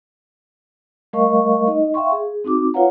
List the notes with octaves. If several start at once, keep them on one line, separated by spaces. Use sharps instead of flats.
G3 A3 A#4 D#5 F5 C#6
D#4 D#5
E5 F5 G5 C6 C#6
G#4
C4 D#4 F#4 D6
F4 B4 C#5 F5 F#5 A#5